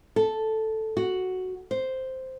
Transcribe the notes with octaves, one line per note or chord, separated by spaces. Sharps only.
A4
F#4
C5